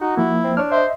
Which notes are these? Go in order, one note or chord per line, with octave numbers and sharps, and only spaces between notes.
D#4 F#4
F3 A#3 E4
C4
D4 C#5 F6
C5 D#5 E5